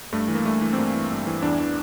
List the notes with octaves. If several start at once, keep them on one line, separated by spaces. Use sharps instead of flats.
G2 A3
E3
A#3
G2 A3
E3
C4
G2 A#3
E3
G2
E3
E2 D4
E3